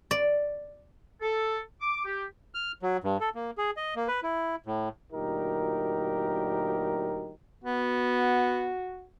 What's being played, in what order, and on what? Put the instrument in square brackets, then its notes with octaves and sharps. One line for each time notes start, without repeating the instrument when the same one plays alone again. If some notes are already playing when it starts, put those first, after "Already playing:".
[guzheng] D5
[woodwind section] A4
D6
G4
[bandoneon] F6
F#3
G2
A4
A#3
G#4
D#5
A#3
B4
E4
A2
[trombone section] D2 A#2 F#3 D#4 G4 A#4
[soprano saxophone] B3 [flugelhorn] F#4